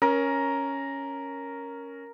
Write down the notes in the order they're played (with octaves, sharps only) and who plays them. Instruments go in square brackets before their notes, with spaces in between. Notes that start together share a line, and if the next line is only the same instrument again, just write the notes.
[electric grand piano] C#4 [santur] A#4